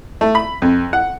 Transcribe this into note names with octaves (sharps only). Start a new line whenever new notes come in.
A3
B5
F2
F#5